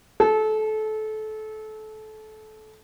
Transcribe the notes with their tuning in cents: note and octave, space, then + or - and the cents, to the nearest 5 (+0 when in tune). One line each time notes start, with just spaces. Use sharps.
A4 -25